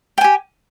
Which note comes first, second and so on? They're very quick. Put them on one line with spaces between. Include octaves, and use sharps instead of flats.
G5 G#5 G4